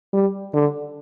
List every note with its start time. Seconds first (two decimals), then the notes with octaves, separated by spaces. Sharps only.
0.13 G3
0.54 D3